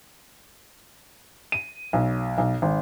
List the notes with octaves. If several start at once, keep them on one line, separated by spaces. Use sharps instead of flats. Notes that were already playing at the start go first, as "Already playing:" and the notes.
D#7
B1
B1
G#1